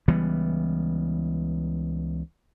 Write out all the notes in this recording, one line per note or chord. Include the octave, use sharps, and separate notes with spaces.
C#2 E3 G3 B3